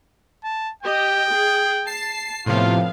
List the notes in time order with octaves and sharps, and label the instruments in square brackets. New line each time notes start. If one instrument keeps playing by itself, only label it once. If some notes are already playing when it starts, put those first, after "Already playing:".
[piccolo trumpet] A5
[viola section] G4 D#5 [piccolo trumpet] G5
[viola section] G#4
[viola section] A5 [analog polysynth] C7
[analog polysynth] A2 C3 F3 [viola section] B3 F5 [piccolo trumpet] F4